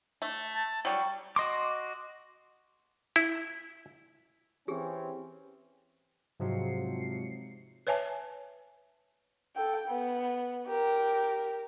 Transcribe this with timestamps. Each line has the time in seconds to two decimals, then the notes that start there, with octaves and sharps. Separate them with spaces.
0.22 A3
0.53 A5
0.85 F#3 G3 C#6
1.36 F#4 D#5 C6 D6
3.16 E4
4.68 E3 C4 C#4 G4 G#4
6.40 G#2 C3 F3 F#3 C7 C#7
7.87 B4 C#5 E5 G#5 A5
9.56 A4 G5
9.88 B3
10.67 G4 A#4